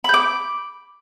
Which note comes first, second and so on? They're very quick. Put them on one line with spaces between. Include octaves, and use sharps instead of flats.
B5 G6 D6